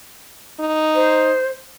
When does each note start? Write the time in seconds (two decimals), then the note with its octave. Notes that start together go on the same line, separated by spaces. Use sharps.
0.60 D#4
0.95 C5